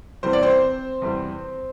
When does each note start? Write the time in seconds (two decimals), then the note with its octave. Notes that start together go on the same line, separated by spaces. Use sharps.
0.23 E2 C3 E3 G3 C5
0.33 D5
0.43 C4 C5
1.02 E2 C3 E3 G3